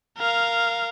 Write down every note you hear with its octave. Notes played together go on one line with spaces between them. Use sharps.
A#4 F5